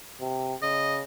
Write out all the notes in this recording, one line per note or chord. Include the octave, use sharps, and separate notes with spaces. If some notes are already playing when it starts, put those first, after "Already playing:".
C3
C#3 D#5